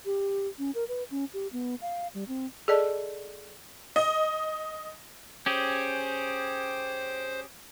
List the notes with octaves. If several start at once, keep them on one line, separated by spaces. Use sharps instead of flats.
G4
C#4
A#4
B4
C#4
G4
B3
F5
G3
C4
G#4 A4 D5 D#5 A5
D#5
C#4 G4 G#4 C5